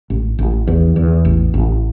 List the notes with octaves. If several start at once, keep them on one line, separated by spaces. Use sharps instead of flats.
A1
A1
E2
E2
A1
A1